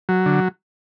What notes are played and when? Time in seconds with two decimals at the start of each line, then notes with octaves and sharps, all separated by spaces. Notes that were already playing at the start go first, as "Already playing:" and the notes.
0.09 F#3
0.26 D3